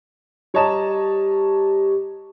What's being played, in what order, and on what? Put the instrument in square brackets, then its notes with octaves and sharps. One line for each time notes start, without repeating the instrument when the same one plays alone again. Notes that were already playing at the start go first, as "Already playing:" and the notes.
[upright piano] G3 C#5 D#5 A5 A#5 E7